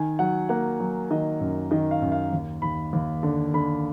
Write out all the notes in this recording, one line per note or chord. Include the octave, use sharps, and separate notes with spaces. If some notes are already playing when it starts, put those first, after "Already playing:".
Already playing: D#3 G#5
F#3 F#5
A#3 F#5
F#3
D#3 D#5
F#2
D#3 D#5
F5
F#2
F5
D#2
D#2 B5
D#2
D3
D3 B5